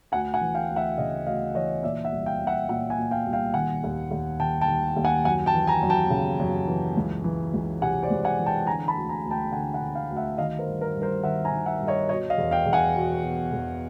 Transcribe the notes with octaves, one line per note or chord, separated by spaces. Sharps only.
D2 F#5 G#5
F#5 G#5
E3
F5 G5
D2
E5 F#5
C#3 D#5 F5
D2 D#5 F5
E3 C#5 D#5
A#2 D5 E5
E5 F#5
C2
F5 G5
C2
E5 F#5
A#2 E5 F#5
F#5 G#5
A#2
F5 G5
C2
F5 G5
D#3 F#5 G#5
D#2
D#2
D#3 G5 A5
G5 A5
D#3
D#2
F#5 G#5
F#2 F#5 G#5
G5 A5
E3
G#5 A#5
F#2
G5 A5
C#3
F#2
E3
C#2
E3
C#2
C3 F#5 G#5
C5 D5
C#2
F#5 G#5
E3
G5 A5
D3 G#5 A#5
A5 B5
D2
G#5 A#5
D2
G5 A5
D3 F#5 G#5
F#5 G#5
D3
F5 G5
D2
E5 F#5
D#3 D#5 F5
A#4 C5
G2
A#4 C5
G2
A#4 C5
D#3 E5 F#5
G#5 A#5
D#3
E5 F#5
G2
C#5 D#5
B2 C#5 D#5
D#5 F5
E2
F5 G5
E2
F#5 G#5
B2
B2
E2